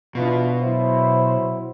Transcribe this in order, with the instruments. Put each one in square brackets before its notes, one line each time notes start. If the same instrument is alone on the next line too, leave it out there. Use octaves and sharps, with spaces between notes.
[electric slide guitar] B2 [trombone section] E3 D4 F4
[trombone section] F#3 E4 [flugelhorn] C5